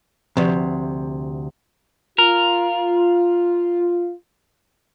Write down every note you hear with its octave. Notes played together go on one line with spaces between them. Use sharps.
D2 C3 F3
F4 A#4